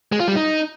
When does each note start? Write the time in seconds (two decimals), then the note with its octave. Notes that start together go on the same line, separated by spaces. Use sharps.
0.12 G#3
0.20 F4
0.28 G3
0.36 D#4